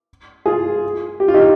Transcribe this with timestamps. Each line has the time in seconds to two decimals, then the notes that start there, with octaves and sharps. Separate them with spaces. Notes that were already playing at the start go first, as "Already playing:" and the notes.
0.46 F4 G#4
1.20 G4
1.28 F4
1.34 D#4 G4